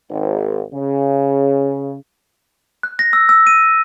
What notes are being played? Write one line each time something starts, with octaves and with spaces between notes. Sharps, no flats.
G#1
C#3
F#6
A#6
E6
E6
D#7